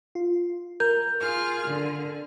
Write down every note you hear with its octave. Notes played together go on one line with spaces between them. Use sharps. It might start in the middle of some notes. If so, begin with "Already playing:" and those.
F4
A#4 G6
F4 G#4 F6
D3